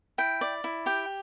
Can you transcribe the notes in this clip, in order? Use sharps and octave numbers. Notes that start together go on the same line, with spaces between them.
E4 G5
D5
E4
G4 G5